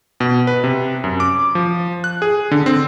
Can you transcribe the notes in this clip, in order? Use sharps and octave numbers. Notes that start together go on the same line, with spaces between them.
B2
B4
C3
F#2
D6
F3
F#6
G#4
D3
C4